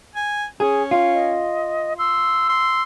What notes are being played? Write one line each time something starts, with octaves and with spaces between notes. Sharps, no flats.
G#5
C#4 G#4
F4
D#5
C6 E6
C6